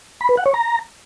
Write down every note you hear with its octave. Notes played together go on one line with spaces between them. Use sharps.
B5
B4
F#5
C#5
A#5